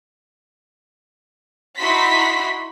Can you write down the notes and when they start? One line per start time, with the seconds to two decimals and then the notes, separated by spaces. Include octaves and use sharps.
1.77 D#4 E4 F#4 B5 C6 B6